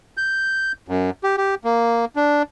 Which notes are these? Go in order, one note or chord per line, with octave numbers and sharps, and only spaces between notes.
G6
F#2
G4
G4
A#3
D4